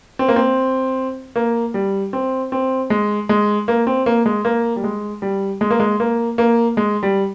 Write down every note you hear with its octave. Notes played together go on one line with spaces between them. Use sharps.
C4
A#3
C4
A#3
G3
C4
C4
G#3
G#3
A#3
C4
A#3
G#3
A#3
G3
G#3
G3
G#3
A#3
G#3
A#3
A#3
G#3
G3